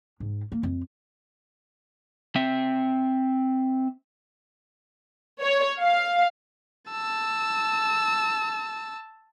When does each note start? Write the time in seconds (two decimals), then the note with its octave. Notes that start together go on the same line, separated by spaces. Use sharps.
0.20 G#2
0.52 A#3
0.63 F2
2.36 C4 E5
5.42 C#5
5.80 F5
6.91 A5 E6